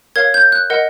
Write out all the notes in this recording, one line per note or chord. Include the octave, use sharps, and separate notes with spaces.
A#4 C#5 F5 G#6
G6
F#6
A#4 D#5 F#5